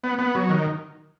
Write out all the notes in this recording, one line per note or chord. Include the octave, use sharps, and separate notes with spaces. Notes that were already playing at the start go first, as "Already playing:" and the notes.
B3
B3
F#3
D#3